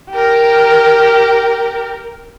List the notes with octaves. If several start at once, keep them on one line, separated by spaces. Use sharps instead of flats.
G4 A#4